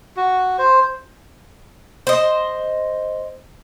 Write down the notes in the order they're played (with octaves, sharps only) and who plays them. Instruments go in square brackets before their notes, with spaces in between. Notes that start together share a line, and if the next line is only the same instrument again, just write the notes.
[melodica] F#4
C5
[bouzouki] C5 D#5